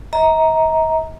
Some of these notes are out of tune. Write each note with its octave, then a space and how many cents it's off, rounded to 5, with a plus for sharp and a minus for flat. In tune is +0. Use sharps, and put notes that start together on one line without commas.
D#5 +45 A#5 +0